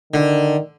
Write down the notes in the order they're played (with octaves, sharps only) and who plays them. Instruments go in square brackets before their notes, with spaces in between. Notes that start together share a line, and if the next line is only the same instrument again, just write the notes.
[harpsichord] D3 [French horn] D#3